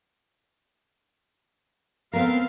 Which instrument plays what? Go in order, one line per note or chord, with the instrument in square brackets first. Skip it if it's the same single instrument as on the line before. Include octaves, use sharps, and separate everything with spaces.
[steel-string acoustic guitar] B3 A4 A#4 [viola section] C4 F5